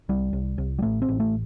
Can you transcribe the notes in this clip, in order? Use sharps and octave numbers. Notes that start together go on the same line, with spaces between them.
C2 G3
C2
C2
G3
A1 A3
C4
A1
A3